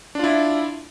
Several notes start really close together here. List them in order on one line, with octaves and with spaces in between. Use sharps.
D4 F4 E4